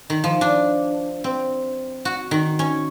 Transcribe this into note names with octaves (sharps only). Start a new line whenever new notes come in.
D#3
F3
D4
C4
F#4
D#3
C#4